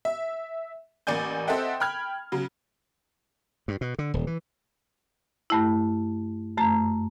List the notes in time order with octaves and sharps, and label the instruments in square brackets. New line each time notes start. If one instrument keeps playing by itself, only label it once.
[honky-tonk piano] E5
A1 A#3 D5 G#5 G6
C4 A4 D#5 E5 F#5 G5
G5 B5 F6 G#6
C#3 F#3
[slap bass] G2
B2
D3
D#1
E3
[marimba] G2 A3 E4
F#2 A3 A#5